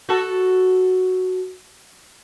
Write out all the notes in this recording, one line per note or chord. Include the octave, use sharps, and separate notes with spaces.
F#4 A4